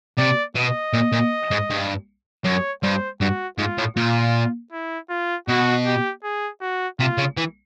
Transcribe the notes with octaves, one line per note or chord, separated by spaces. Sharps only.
C3 D5
B2 D#5
A#2
A#2
G#2
G2
F#2 C#5
G2 C5
G2 F#4
G#2 F4
A2
A#2 F4
E4
F4
B2 F#4
G4
G#4
F#4
C3 F4
C#3
E3